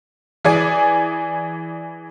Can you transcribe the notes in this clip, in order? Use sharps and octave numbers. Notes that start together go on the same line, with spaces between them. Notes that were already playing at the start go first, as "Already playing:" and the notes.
E3 G#4 D5 G#5